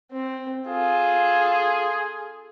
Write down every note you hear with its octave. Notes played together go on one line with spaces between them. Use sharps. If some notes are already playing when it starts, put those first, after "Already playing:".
C4
F4 G#4 A4